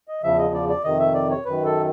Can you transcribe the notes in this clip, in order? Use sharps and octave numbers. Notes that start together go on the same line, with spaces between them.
D#5
E2 C#3 F3 E5
D#5
D5
D5
F2 C3 D#3 D#5
E5
D5
C#5
F#2 D#3 B4
A4